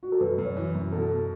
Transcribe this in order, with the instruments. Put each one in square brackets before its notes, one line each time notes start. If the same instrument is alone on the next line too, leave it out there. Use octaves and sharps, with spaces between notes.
[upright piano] F#4
A4
[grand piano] F#2 [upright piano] B4
[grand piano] F#2
[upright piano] C#5
[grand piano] E3
F#2
[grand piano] B2 [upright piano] A4
[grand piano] B2